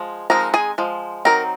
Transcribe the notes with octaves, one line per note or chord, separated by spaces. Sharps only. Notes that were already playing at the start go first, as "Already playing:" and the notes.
Already playing: F3 G#3
F3 G#3 C4 D#4 A#4 A#5
G#4 G#5
F3 G#3
F#3 C4 D#4 A#4 A#5